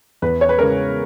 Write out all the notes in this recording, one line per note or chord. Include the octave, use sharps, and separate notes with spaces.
E2 B4
C#5
B4
C#3 G#3 C#4 A#4